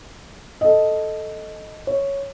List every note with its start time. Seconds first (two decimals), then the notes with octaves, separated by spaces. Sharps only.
0.61 A4 D#5
1.87 C#5